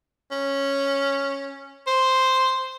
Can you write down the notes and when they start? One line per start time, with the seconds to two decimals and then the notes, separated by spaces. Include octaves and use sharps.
0.31 C#4
1.87 C5